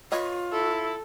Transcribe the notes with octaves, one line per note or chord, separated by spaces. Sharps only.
F4 B4 C#5 D#5
E4 A4